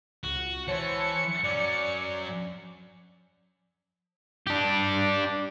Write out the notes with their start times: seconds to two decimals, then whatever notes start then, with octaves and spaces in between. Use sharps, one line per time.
0.24 C#2 F#4
0.68 E3 C5 C#5 A5 C#7
1.44 F#3 C#4 D5
4.47 D4 G4